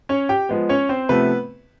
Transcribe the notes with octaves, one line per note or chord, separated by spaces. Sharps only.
C#4 C#5
G4 G5
F3 G#3 B3
C#4 C#5
C4 C5
C3 F3 A3 B3 B4